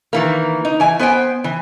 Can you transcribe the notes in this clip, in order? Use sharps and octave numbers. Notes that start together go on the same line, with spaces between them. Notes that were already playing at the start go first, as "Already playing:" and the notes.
D#3 E3 A#3
D#4
E3 G#5
B3 C5 F5 G5 G#5
E3